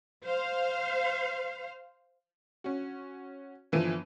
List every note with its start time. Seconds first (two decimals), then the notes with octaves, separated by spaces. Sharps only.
0.25 C5 F5
2.64 C#4 F#4
3.72 G1 E3 F3 D#7